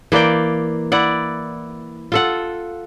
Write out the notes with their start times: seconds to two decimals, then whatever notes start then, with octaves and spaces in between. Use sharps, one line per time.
0.12 E3 A#3 D5 G5
0.92 E4 D5 F#5
2.12 F4 A4 F#5